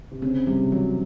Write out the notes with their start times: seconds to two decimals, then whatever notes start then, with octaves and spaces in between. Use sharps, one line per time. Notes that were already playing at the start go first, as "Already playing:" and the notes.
0.11 C3
0.22 C#3 C4
0.47 C3 G3
0.72 E3 F#3